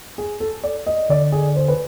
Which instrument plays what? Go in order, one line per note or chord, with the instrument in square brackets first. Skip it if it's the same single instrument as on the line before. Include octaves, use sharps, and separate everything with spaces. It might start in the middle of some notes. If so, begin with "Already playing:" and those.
[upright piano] G#4
A4
D5
D#5
[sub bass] D3 [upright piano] D5
[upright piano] G#4
C5
B4